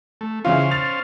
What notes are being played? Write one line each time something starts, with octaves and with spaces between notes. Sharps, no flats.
A3
C#3 E3 C#4 F4 C5 F5
A6 F7